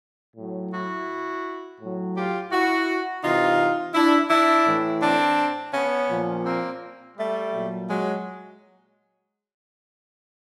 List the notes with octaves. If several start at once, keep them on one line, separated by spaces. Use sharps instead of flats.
A2 F#3
E4 F#4
A2 F#3
F4 G4
E4 F#4
C3 E3 D#4 F4
D4 E4
D4 E4
A2 E3
C4 D4
B3 C#4
A#2 F3
A#3 C4
G3 A3
A#2 F#3
F#3 G#3